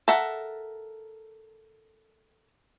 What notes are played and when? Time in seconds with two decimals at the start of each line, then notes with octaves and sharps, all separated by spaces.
0.08 A4 A#4 E5 F#5